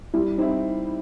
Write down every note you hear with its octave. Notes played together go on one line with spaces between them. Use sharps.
G3 E4
C4 D#4 E4